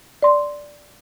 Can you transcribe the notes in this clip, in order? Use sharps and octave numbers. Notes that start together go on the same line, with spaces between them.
D5 C6